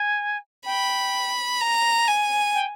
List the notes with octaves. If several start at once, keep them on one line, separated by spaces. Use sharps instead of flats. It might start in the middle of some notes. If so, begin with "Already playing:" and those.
Already playing: G#5
G5 B5
A#5
G#5
G5